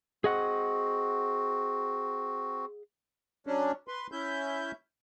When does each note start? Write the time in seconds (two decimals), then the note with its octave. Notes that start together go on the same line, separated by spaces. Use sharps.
0.24 C4 F#4 G#4 D#5 F#5
3.47 F#3 C#4 D4
3.88 B4 C6
4.12 C#4 E4 E5 G6